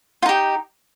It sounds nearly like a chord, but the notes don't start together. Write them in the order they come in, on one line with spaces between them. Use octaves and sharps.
F4 D#4 G4